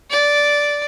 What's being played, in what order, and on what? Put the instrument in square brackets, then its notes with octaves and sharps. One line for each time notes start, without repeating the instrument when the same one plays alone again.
[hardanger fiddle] D5